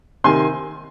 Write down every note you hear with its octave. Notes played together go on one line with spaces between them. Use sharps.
C3 D#3 G#5 C6